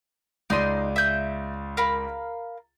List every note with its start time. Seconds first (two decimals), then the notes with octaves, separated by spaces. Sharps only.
0.50 C#2 D#4 D5 C6 D#7
0.96 E5 G6
1.77 A#4 F5 B5